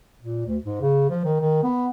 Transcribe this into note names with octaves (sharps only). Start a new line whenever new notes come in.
A#2
D2
G#2
C#3
F3
D#3
D#3
B3